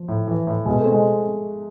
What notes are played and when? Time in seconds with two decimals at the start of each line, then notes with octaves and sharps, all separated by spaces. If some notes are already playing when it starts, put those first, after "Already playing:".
Already playing: F3
0.08 A2
0.28 E3
0.47 A2
0.65 B2 G#3
0.79 A3
0.85 C4
0.92 G#3